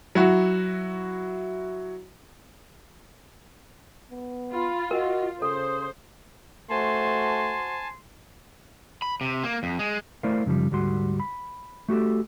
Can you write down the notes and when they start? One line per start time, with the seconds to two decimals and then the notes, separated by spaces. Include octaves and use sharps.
0.15 F#3 E4 F#4
4.11 B3
4.52 F4 B5
4.91 F#4 A#4 D#5
5.42 C#3 A4 C5 D#6
6.70 A3 F#4 C5 G#5 A5 C6
9.02 B5
9.21 C3
9.44 A#3
9.63 F2
9.79 G#3
10.23 A3 E4 A#4 C5 D5 F5
10.46 F#2 C#3 E3 F3 G3
10.71 D2 G#2 G3 F#4 C6
11.20 B5
11.89 A3 F#4 G4 A4